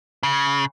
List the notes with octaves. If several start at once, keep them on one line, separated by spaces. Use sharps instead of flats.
C#3